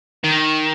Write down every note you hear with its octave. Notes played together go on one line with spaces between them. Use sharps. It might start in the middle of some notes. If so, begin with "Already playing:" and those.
D#3